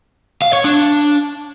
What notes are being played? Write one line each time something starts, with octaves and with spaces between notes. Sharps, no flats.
F5
C#5
D4